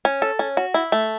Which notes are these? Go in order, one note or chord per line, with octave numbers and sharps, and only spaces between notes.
C#4
A4
C#4
F#4
E4
A3